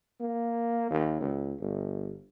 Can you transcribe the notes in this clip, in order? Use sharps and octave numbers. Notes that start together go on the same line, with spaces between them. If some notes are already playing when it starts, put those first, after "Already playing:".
A#3
D#2
C#2
G1